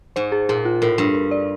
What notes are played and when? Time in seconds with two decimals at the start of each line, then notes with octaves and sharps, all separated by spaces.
0.16 G#2 C5
0.32 G#4
0.49 A#2 G#4
0.65 F4
0.82 A2 A#4
0.98 G2 A#4
1.15 A#4
1.31 D5